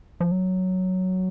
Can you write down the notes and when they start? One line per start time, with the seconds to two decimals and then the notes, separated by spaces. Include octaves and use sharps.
0.20 F3
0.31 F#3